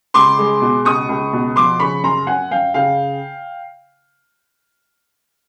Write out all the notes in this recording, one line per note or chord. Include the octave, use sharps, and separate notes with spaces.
C#2 C6 D6
G#3
B2
C#2 C#6 D#6
C#2
B2
F3 C6 D6
C#3 B5 C#6
F#2 A#5 C6
F#2 F#5 G#5
F#2 F5 G5
C#3 F5 G5